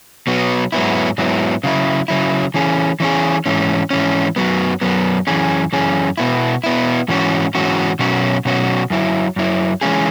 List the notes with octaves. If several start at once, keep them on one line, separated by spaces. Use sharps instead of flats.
B2 F#3 B3
G#2 F#3 B3 E4
G#2 F#3 B3 E4
C#3 F#3 E4
C#3 F#3 E4
E3 C#4 G#4
E3 C#4 G#4
G#2 E3 C#4
G#2 E3 C#4
F#2 F#3 B3
F#2 F#3 B3
F#2 E3 C#4 G#4
F#2 E3 C#4 G#4
B2 B3 E4
B2 B3 E4
G#2 E3 C#4 F#4
G#2 E3 C#4 F#4
B2 F#3 C#4 F#4
B2 F#3 C#4 F#4
F#2 F#3 E4
F#2 F#3 E4
E3 G#3 C#4 G#4